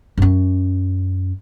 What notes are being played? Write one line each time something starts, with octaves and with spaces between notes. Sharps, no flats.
F#2 C#4